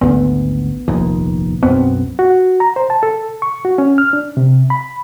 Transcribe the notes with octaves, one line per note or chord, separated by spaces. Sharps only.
G#1 D2 B3
F1 A#1 D#2
B1 F#2 B3 C4
F#4
A#5
C5
A5
A4
C#6
F#4
C#4
F6
D4
C3
B5